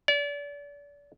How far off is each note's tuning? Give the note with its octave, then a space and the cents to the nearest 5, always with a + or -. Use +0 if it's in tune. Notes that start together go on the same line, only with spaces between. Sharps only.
D5 -35